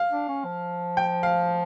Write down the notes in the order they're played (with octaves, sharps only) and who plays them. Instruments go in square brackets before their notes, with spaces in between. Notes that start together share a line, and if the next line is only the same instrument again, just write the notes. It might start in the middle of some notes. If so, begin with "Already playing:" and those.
Already playing: [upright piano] F5
[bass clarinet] D4
C#4
F3
[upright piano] G5
F5